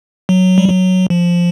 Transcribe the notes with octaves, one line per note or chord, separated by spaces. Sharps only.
F#3
G3
F#3
F3